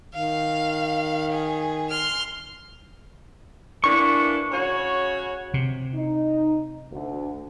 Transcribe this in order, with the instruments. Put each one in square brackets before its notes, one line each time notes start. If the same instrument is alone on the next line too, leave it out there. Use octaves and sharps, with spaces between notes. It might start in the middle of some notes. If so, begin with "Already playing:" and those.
[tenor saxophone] D#3 [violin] F5
[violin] G#4
C6 F6
[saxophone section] E3 A#3 D4 [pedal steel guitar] C#6
[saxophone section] C#3 F#4 C#5
[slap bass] C3
[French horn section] D#4
D2